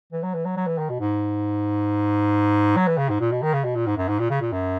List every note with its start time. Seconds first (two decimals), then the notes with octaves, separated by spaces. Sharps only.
0.13 E3
0.23 F#3
0.34 E3
0.45 F#3
0.57 F#3
0.67 E3
0.78 D#3
0.90 B2
1.00 G#2
2.76 F#3
2.87 E3
2.98 C#3
3.09 G#2
3.20 A#2
3.32 B2
3.42 D#3
3.53 C#3
3.64 B2
3.75 A#2
3.87 G#2
3.97 F#2
4.08 G#2
4.19 A#2
4.30 C#3
4.41 A#2
4.52 F#2